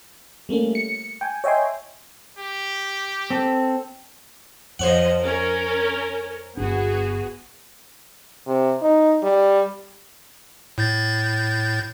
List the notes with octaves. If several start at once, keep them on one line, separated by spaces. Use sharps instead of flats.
G3 A3 A#3 C#4
C#7
G5 G#5
C#5 D#5 E5 G5 G#5 C6
G4
C4 A4
F2 F3 C5 C#5 D#5 F#5
C#4 A#4
G1 B3 D4 F#4 G#4
C3
D#4
G3
A2 G6 A6